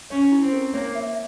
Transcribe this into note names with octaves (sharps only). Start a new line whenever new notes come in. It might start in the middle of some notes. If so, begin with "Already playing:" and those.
C#4 C#5
E4
C4
A#4
A#3 C#5
E5